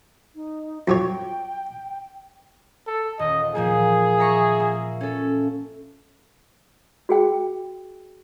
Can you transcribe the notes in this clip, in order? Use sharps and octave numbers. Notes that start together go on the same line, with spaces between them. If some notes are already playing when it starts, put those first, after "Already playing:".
D#4
F2 F#3 C#5 G5
A4
D#1 D#5
A#2 F3 A#3 G#4
E5 A#5 C#6
A#3
C#4 A4
F#4 G#4 G5